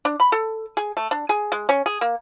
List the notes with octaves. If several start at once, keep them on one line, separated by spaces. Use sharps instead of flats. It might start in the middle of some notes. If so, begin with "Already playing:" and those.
D4
B5
A4
G#4
A3
D4
G#4
G#3
C#4
G#4
A#3